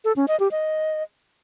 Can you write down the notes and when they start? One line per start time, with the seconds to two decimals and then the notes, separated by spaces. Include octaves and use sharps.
0.05 A4
0.16 C#4
0.28 D#5
0.40 G4
0.51 D#5